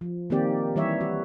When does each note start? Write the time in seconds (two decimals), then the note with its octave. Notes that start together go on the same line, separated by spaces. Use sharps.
0.01 F3
0.30 D#3 A#3 C4 G4 D5
0.76 E3 G3 C#5 E5
1.01 F#4